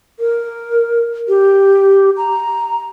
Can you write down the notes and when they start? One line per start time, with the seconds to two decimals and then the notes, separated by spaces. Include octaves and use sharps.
0.19 A#4
1.28 G4
2.17 A#5